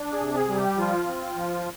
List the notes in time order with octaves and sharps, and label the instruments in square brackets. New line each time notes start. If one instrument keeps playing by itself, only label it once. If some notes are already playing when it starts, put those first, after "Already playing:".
Already playing: [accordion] D4
G#4
C3
G#4
G3
G4
F3 F4
C4
F3